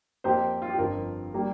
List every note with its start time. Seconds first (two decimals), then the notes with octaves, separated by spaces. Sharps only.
0.24 F2 F3 A#3 G4 C5
0.62 F4
0.70 G4
0.78 G1 F2 F3 C4 F4 A#4
1.34 G3 A#3